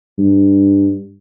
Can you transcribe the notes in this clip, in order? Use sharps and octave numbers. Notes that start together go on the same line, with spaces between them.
G2